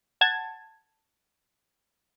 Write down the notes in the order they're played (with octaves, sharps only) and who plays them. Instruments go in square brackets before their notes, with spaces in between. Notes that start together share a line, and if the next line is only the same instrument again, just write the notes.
[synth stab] F#5 A5 G#6